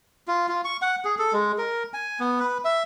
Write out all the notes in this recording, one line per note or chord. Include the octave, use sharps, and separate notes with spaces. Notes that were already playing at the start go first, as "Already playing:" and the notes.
F4
F4
C#6
F#5
G#4
A4
G#3
A#4
G#5
B3
B4
E5